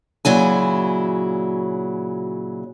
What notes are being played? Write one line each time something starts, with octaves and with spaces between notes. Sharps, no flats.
A#2 C#3 F#3 E4 G#5